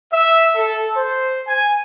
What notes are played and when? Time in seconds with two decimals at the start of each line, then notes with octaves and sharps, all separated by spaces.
0.11 E5
0.56 A4
0.96 C5
1.47 G#5